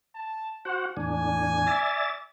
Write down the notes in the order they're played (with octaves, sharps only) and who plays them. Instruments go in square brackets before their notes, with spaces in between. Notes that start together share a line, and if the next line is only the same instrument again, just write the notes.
[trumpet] A5
[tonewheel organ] F#4 F#5 [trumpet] C5
[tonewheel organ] E2 A2 D4 [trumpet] G#5
[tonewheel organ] D5 E5 A6